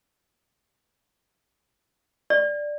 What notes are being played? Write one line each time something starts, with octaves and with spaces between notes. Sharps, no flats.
D5